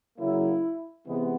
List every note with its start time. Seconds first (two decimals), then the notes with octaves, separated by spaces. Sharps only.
0.18 C#3 F#3 A#3 E4
1.06 C3 E3 G#3 B3